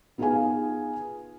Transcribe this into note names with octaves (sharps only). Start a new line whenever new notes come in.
B3 D#4 F4 G#4 F5 G#5